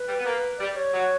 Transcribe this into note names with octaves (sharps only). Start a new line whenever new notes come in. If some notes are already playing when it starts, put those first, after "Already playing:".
Already playing: B4
G3
B3
A#3
G3 D5
C#5
F#3